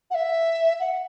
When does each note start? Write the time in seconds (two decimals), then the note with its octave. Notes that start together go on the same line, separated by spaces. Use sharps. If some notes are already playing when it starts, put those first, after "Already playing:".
0.11 F#5
0.15 E5
0.80 F#5